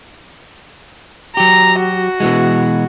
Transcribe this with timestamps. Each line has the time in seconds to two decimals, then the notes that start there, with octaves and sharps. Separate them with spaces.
1.37 F#3 G4 A#5
1.79 F#4
2.20 B2 E3 G#3